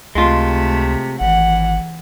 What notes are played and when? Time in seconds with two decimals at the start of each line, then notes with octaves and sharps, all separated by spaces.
0.15 C#2 C3 G#3 A3 F4
1.21 G#1 E3 F#5